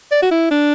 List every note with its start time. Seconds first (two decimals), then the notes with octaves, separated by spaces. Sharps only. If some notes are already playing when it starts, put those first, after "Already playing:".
0.12 D5
0.22 F#4
0.31 E4
0.51 D4